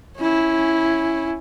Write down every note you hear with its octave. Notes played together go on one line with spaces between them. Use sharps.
C#4 E4